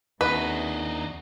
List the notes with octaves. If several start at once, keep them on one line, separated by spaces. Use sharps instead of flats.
D#2 C3 D4 D#4 F#4 G#4 B4